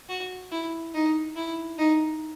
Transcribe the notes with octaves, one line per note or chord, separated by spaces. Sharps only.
F#4
E4
D#4
E4
D#4